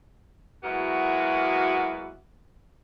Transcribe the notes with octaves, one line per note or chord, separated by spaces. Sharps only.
F#3 G#3 A#3 B3 E4 F#4